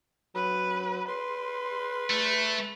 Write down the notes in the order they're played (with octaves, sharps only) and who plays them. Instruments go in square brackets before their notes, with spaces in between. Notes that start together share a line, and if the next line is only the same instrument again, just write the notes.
[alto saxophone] F#3 [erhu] B4
[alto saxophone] B4 [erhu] C6
[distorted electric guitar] A3